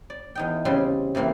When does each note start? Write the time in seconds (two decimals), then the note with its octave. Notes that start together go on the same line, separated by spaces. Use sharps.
0.10 D5
0.35 E2 D#4 G5
0.65 C#3 G3 C4 C6
1.15 C3 E3 A#3 C4